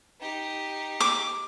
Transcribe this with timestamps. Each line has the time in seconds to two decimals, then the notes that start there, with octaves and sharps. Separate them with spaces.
0.21 D#4 G4
1.00 D6